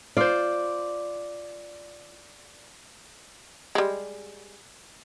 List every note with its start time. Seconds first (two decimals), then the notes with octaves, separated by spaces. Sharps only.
0.17 F4 C5 D5
3.75 G3 G#3